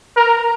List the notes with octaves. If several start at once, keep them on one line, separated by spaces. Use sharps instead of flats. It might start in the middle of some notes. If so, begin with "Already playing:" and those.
A#4